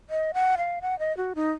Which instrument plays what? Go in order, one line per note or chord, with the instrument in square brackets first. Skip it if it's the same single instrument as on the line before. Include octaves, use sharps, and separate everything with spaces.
[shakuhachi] D#5
F#5
F5
F#5
D#5
F#4
D#4